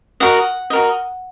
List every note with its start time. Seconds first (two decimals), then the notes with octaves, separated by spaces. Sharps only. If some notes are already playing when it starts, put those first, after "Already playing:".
0.20 F#4 A#4 D#5 F#5
0.70 F#4 A#4 D#5